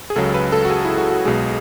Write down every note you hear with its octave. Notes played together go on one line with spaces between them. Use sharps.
G#4
C#2 C#3 F#3 A4
B4
A4
F#4
G#4
E4
F#4
F#4
B1 B2 G#3 G#4